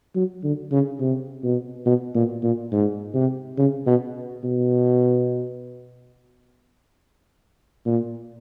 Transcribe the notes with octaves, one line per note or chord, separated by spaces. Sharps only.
F#3
D3
C#3
C3
B2
B2
A#2
A#2
G#2
C3
C#3
B2
B2
A#2